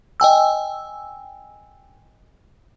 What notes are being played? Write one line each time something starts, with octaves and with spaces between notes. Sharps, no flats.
D#5 G5 G#5 E6